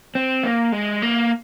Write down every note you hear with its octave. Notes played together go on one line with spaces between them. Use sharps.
C4
A#3
G#3
A#3